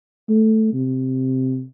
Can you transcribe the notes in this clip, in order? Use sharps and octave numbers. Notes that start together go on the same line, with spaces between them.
A3
C3